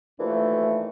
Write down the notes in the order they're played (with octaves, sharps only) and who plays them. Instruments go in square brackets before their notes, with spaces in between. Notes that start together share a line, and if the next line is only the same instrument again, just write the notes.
[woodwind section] D#2 D3 E3 F3 A3